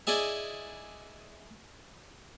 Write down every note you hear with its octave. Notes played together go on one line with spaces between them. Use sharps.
E4 G#4 D5 D#5